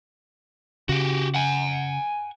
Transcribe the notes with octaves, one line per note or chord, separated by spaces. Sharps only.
C#3 F#4 G4
F#5 G#5